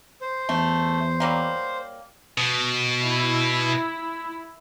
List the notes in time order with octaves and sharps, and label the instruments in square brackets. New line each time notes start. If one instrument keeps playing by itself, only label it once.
[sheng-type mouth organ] C5
[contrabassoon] E2 [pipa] A3
[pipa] F#3 G3 A#3
[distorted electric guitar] B2
[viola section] E4